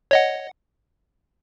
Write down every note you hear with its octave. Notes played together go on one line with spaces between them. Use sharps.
C#5 D#5 F#5